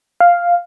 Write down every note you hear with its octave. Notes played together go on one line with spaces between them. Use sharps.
F5